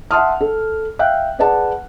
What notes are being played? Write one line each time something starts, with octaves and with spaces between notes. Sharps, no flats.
E5 F#5 A5 C6 D#6 F6
A4
E5 F5 G5 F#6
G#4 B4 D5 F#5 A5